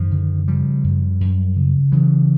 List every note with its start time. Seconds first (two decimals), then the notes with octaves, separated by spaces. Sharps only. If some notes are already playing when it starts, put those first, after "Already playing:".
Already playing: F#2 D#3 F3
0.11 D3
0.47 C#3 F3 G3
0.84 F#2
1.21 F#2
1.56 C#3
1.92 C#3 E3 F#3